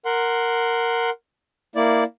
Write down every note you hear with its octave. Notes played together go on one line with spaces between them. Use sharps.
A#4 F#5 C6
A#3 E4 D5